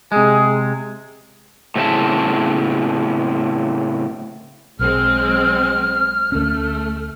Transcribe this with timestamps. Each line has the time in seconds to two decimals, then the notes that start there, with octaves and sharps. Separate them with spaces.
0.12 C3 G#3 G#4
1.76 A2 C#3 C4 C5 E5 A5
4.79 B1 F#3 G#3 C4 F6
6.32 D2 A3 C#4